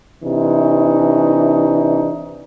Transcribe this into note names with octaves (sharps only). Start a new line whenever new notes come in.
C3 E3 D4 D#4